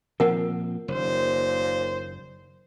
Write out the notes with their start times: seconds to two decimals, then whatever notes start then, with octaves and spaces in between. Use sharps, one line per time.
0.20 A#2 F3 C4 A#4 F#5
0.88 F#1 D#2 A#2 C5